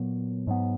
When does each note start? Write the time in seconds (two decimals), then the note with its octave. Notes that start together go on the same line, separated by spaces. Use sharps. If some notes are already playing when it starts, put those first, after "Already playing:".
Already playing: A#2 F#3 B3
0.47 G#2 F#3 B3